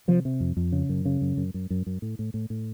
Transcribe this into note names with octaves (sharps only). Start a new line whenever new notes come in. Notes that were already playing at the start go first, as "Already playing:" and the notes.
C3 F3
C3
F2
F2
C#3
F#2
C#3
F#2
F#2
F#2
F#2
F#2
A2
A2
A2
A2